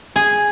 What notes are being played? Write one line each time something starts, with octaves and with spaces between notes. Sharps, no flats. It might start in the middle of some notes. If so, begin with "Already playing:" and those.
G#4